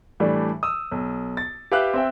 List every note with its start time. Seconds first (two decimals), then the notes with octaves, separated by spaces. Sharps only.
0.20 A2 E3 G3 A3 D4
0.63 D#6 E6
0.91 B1
1.37 A6
1.72 G4 B4 E5 F5 G5 F#6
1.94 C4 E5 G5